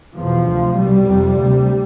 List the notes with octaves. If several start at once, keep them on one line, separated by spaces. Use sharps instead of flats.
E2 B2 F3
D2 C3
C2 B2 G3
F2 C3
D2 C3